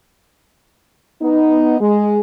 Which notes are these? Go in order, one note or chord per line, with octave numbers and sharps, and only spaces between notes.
B3 D#4
G#3